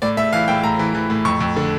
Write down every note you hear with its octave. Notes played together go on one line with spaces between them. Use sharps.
A2 D5
A2 E5
E3 F5
A2 G5
A2 A#5
E3
E3
A2
F2 C#6
F2
D3